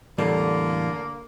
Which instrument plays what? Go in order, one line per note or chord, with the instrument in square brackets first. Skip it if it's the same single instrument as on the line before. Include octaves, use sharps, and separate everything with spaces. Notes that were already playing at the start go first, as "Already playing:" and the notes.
[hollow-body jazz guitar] E2 A2 G3 [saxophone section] D3 A#3